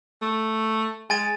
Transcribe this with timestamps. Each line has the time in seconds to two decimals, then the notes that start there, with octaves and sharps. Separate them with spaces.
0.22 A3
1.10 G#3 G#5 A6 D#7